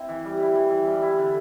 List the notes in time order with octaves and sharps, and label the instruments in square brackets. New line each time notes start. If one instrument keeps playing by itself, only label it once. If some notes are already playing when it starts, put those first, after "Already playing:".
Already playing: [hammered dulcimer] C4 E4
E3
G3
E4
E3
E3
G3
E4
D3